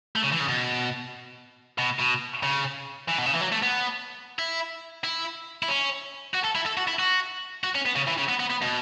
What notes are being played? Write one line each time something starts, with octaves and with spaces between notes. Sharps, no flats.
A3
C#3
E3
C#3
B2
B2
B2
C#3
E3
B2
C#3
E3
F#3
A3
B3
E4
E4
E4
C#4
F#4
A4
E4
A4
F#4
E4
F#4
F#4
C#4
B3
C#3
E3
C#3
B3
B3
B3
B2